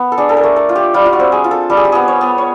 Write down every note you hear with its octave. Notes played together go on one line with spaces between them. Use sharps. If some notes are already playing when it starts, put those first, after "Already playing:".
Already playing: B3
A4
D4 G#4
A4
A#4
A3
A4
F4
G4
G3 F4
F4
F#4
C4
G#4
F4
A4
G3 A4
G#4
G4
B3 G#4
C#5
B3
C#5